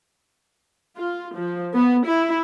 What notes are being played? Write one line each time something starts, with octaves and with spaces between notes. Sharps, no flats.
F4
F3
B3
E4